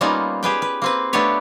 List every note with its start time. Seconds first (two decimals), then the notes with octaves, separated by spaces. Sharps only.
0.01 G3 A#3 B3 C#4 D#4 F4
0.43 G4 G#4 B4 G5
0.62 B4
0.82 A#3 C4 B4
1.13 A3 B3 D4 G4 B4 C#5